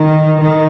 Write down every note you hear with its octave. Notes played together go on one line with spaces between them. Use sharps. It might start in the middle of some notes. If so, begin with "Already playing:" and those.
Already playing: D#3
D#3